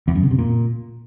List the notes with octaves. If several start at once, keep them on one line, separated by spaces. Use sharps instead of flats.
E2
F#2
C#3
C3
A#2